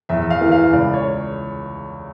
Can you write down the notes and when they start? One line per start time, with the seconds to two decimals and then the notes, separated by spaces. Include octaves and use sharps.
0.09 E2 E5
0.22 E5
0.30 F5
0.41 E3
0.52 F5
0.73 C#2 D5
0.94 C#5